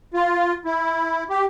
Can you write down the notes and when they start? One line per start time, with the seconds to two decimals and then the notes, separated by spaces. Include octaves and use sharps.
0.14 F4
0.65 E4
1.30 G4